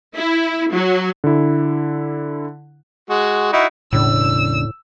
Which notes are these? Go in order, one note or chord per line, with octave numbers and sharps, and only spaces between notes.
E4
F#3
D3 E4
G#3 F#4
D#4 E4 F#4
E1 A2 C#3 D4 E6